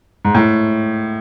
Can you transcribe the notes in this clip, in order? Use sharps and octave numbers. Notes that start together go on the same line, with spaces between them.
G#2
A2